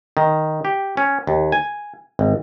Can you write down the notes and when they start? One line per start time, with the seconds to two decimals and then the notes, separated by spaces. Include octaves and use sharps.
0.17 D#3
0.65 G4
0.97 C#4
1.27 D#2
1.52 G#5
2.19 G#1